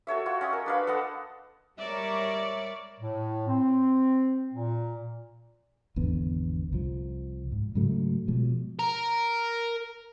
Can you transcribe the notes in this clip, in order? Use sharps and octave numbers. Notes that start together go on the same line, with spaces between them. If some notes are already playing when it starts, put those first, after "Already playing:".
F#4 A4 C#5 E5
F4 F#4 C#6
C#4 D#5 G#5
A#4
D4 B4 F5
A4 B4 D#5 F#5
G3 A#4 C#5 D5 E5 D6
A2
C4
A#2
G#1 E2 D3 B3
C2 F3
G#2
G#2 C#3 F#3 A3
B2 F3 G#3
A#4